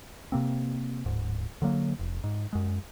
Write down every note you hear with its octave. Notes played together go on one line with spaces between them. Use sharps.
C3 A#3 C4
D1 G#2
D3 F#3 A#3
F1
G#2
F#2 G#3